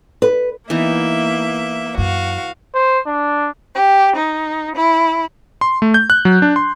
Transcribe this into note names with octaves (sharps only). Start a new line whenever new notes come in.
B4
E3 A#3 B3 D#4 E5
F#2 F#4 F5
C5
D4
G4
D#4
E4
C6
A3
G6
F#6
F#3
D4
C6